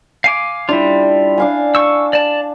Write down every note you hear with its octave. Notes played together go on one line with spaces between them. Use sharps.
F5 G#5 D6
G3 D4 E4 F4
D4 F5 G#5
C#6 E6
D5 A5